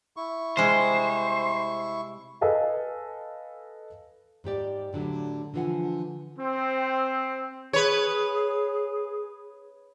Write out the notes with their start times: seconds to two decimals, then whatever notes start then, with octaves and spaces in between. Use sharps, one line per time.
0.17 E4 C#6
0.57 C3 G3 G#3 C5
2.41 A4 B4 D#5 F5 G#5
4.44 G#2 G3 G4 D5
4.93 A2 D3 F#3 G3
5.54 D3 E3 F3 F4 F#5 G#5
6.37 C4
7.73 G#4 B4 C#5